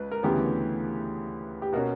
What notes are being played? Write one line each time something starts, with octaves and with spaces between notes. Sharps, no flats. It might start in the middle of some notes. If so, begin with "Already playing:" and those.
Already playing: C#2 B4
A#4
D2 C#3 E3 B3 G4 B4
G4
B2 A#3 C#4 F#4 A#4